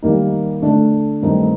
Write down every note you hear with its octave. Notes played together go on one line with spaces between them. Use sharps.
D#3 G3 A#3 D#4
D3 A3 D4
G2 D#3 A3 C4 D#4